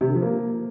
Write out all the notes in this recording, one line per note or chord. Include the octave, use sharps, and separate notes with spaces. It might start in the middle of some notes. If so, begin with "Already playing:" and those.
C3
D3
F3
A#3